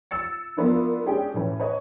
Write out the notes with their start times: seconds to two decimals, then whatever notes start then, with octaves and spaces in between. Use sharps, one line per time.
0.11 E6 A6 C#7
0.57 F3 A#3 B3 D4 E4
1.06 G#3 C#4 D4 G4 G#4 G5
1.34 A2 E3 C#4 B4
1.60 B4 C#5 D#5